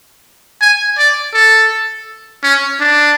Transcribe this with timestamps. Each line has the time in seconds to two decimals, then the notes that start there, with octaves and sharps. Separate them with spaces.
0.61 G#5
0.98 D5
1.34 A4
2.43 C#4
2.80 D4